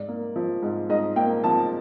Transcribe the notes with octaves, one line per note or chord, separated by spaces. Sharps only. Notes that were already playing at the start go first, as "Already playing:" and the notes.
Already playing: G#2 D5
A#3
F3
G#2
G#2 D#5
A#3 G5
F3 A5